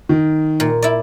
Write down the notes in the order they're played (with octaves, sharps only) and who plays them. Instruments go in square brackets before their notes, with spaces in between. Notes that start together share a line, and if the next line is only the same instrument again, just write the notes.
[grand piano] D#3
[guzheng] A#2
E4 D5